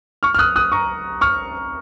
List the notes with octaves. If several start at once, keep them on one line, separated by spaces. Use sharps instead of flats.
C#6 F6
F6
D#6 F#6
D#6 F#6
A#5 C#6
C#6 F6